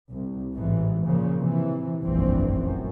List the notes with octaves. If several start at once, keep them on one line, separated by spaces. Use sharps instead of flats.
C2
A1 G#2 E3
A#2 C#3 F3
C3 E3
F1 A#1 G2 E3 C4
F#2